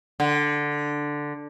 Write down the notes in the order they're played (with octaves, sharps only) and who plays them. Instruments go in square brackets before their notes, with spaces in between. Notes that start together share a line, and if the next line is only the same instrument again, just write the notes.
[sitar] D3